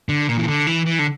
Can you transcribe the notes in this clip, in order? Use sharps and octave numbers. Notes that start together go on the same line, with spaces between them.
D3
A#2
E3
D3
E3
E3
D3